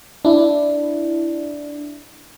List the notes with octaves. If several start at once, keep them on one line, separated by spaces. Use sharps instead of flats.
D4 E4